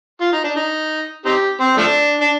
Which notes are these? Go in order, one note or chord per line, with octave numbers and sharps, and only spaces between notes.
F4
D#4
D4
D#4
C4 D#4 G4
C4
F3 A3 D4
D4